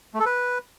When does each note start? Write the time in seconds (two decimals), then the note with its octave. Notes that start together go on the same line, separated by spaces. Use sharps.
0.14 A3
0.20 A4
0.26 B4